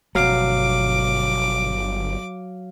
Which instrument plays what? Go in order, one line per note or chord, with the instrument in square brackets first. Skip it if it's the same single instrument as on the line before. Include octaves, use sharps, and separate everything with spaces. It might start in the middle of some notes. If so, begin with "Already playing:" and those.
[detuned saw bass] G1 [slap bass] B2 F3 A3 [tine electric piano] F#3 F5 [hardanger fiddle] D6